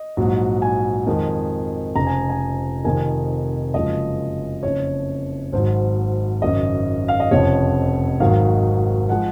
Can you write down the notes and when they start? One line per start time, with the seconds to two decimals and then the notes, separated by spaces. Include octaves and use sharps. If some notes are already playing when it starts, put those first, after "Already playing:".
Already playing: D#5
0.17 A#1 G#2 F#3
0.62 G#5
1.06 F2 D#3 G#3
1.95 F1 F2 C#3 A#5
2.07 G#5
2.29 G#5
2.84 F1 F2 D#3 G#5
3.74 F#1 F#2 F3 G#3 D#5
4.63 F#1 F2 C#3 C#5
5.52 G#1 G#2 F#3 C5
6.42 G#1 F#2 C#3 D#5
7.08 F5
7.20 D#5
7.31 F1 F2 C#3 C#5
8.20 G#1 G#2 D#3 F#3 F5
9.09 F3 G#3 F#5